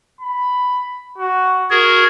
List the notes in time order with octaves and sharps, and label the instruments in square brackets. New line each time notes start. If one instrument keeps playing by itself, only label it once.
[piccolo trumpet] B5
F#4
[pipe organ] F#4 G#4 A#4 [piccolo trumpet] G#6